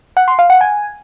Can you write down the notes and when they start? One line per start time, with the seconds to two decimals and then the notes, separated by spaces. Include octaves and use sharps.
0.17 F#5
0.28 C6
0.39 F5
0.50 F#5
0.61 G#5